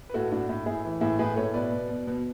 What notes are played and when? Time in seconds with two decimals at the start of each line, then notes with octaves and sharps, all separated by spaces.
0.09 B4
0.14 A2 F#4 A4
0.31 A2 D4 F#4
0.49 A2
0.66 A2 E4 G#4
0.85 E3
1.01 A2 E4 G#4
1.19 A2 G#4 B4
1.36 A2 A4 C#5
1.54 B2 B4 D5
1.71 B2
1.89 B2
2.07 B2